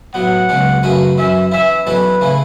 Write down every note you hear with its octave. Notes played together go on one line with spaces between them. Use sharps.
A2 F#3 B3 F#5
C#2 B2 F#3 C#4
F#2 C#3 A3 F#4 B4
F#2 E3 C#4 E5
E3 C#4 E4 E5
E2 B2 F#3 C#4 A4 B4
C#3 E3 A3 E4